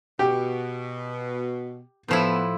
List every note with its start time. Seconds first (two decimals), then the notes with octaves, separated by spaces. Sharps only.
0.19 B2 G4
2.08 A2 F3 B3 E4